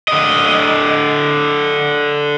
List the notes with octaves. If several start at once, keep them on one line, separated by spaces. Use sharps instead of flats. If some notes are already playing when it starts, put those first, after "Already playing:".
D3 D#5